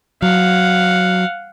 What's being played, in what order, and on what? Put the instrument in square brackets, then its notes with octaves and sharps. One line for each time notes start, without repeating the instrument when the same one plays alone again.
[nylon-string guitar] F#3 [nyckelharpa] F5 F#5